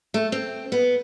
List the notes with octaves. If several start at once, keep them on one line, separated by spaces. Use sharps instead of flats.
A3
C4
B3